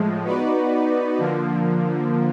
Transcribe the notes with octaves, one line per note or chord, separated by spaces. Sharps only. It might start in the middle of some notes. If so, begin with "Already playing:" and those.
Already playing: A2 F3 G#3
B3 D#4 F#4 B4 D5
D3 F3 A#3